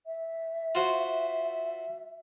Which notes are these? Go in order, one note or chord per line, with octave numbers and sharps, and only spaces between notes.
E5
F4 F#4 C5